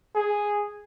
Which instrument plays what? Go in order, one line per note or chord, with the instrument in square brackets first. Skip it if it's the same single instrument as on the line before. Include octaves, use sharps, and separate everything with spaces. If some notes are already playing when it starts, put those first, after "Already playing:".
[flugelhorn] G#4